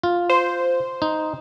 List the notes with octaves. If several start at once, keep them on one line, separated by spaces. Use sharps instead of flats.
F4
C5
D#4